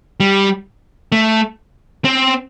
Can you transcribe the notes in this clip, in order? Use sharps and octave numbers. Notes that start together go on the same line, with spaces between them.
G3
A3
C4